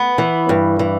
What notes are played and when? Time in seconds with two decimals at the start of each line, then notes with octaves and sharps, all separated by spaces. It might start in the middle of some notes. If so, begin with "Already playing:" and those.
Already playing: B3
0.18 E3
0.49 G2
0.79 E3